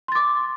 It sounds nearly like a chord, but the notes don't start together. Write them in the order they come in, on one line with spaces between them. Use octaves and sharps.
C6 A6 D6